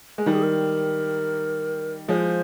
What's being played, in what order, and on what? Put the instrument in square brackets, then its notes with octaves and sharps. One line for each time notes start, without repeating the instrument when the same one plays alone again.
[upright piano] G#3
[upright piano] D#3 G3 [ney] A#4
[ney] G#4
A#4
[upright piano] F3 G#3 [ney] C#5
[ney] C5